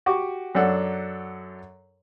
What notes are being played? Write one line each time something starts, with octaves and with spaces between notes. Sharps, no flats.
F#4 G4 C#6 D6
F#2 F#3 D4 A4 F#5